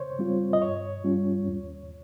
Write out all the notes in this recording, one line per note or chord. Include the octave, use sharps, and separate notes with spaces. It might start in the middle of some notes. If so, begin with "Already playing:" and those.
Already playing: C#3 C5 C#5
G3 C4 F4
D#5
G2 C#5
G3 C#4 F4
D#2